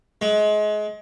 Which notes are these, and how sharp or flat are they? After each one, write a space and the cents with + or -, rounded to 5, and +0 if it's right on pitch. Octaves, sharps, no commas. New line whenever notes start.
G#3 +30